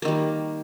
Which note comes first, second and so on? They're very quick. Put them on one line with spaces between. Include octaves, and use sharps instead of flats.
A#3 D#3 G3